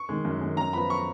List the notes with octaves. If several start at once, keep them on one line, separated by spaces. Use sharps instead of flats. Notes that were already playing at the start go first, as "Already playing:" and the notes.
Already playing: C#6
D#3 G#3
F#2
D#3 G#3
F#2 A#5
F3 B3 B5
C#6